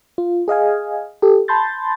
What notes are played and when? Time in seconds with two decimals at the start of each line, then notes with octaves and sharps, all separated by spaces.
0.18 F4
0.48 G#4 D#5 F5 G#5
1.22 G4 A4
1.48 A5 B5 C6 G6 A6